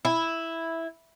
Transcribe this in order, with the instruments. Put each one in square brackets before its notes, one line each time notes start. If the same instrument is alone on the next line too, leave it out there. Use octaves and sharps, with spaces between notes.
[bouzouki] E4